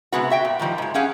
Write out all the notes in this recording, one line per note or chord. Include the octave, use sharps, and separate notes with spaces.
C3 G#3 B3 F#4
F#4 E5 G5
A#2
A2 D#3 F3 G3
G#2 G#3
C#4 G4 G#4 F5 F#5